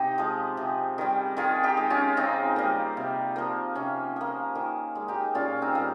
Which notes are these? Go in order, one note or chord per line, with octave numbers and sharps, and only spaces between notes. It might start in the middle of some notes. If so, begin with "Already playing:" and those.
Already playing: C3 D#4 G4
F3 G#3
C3
D#3 G3
D#3 F4 G#4
D#4 G4
G#3
C#4 F4
C#3 C4 D#4
G3 A#3
C3
F3 A#3
C3 C#4
F3 A#3
D#3
G#3
D#4 G4
A#2 C#4 F4
C4 D#4
G3 A#3